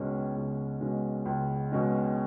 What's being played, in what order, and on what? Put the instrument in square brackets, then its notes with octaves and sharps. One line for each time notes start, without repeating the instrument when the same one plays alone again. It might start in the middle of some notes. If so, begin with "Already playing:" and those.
Already playing: [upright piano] C#2 B2 G#3 C#4
C#2
B2 G#3 C#4
C#2
B2 G#3 C#4